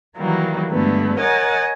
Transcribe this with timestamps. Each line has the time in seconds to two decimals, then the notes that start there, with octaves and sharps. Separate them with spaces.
0.17 D#3 E3 F#3 G3 A#3
0.71 G2 D3 G#3 A3 B3
1.19 A#4 C#5 D#5 F#5 G#5 A6